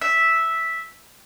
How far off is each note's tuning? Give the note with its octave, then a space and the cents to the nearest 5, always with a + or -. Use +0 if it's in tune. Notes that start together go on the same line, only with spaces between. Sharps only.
E5 -5